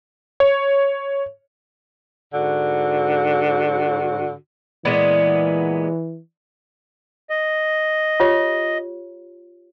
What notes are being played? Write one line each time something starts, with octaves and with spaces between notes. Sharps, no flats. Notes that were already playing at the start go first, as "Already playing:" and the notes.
C#5
G#2 D3 F#4
A#2 E3 G#3 B3
D#5
F4 G4 C#5